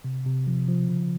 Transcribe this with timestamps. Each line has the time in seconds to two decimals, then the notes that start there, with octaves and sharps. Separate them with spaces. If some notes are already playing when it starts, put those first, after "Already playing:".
0.04 C3
0.26 C3
0.47 F3
0.68 F3
0.89 C#3